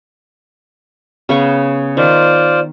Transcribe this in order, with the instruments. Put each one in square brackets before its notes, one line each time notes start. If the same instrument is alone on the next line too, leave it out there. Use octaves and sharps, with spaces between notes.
[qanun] C#3 B3 C#6
[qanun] D#3 [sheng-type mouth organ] F4 C5 D5